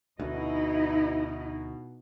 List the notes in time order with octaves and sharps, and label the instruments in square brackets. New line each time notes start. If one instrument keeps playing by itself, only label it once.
[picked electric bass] D2 [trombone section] B2 [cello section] D#4 E4 D#5